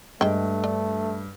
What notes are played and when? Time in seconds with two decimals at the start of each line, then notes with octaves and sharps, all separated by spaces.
0.21 G2 G#3 A3 G5
0.64 D4